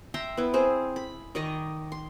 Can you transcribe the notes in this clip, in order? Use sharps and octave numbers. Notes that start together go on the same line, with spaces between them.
E5 G5 A#5 C6
B3 E4
C4 G#4 C5
B5
D#3 D5 D#5 C#6
C6